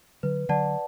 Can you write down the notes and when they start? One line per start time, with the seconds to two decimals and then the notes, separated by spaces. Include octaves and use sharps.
0.23 D3 F#3 B4
0.49 D3 F#3 D5 F#5 A5